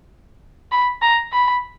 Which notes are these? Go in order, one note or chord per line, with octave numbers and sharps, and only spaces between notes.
B5
A#5
B5